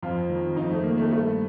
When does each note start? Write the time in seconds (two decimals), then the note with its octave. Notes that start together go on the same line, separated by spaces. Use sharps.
0.03 F2 F4
0.29 D#3
0.56 F2 D#4
0.71 A3
0.83 D#3 A#3
0.97 A3
1.11 G2 A3